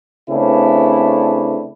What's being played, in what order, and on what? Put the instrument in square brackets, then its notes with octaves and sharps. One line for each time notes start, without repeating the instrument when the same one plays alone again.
[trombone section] C#3 A3 B3 C4 D4 E4